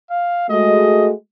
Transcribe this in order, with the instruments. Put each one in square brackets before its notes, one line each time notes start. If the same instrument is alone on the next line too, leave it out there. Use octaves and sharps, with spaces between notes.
[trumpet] F5
[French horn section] G#3 A3 F#4 [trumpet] D#5